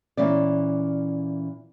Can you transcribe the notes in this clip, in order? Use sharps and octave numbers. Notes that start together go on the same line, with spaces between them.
A#2 E3 C#4 D5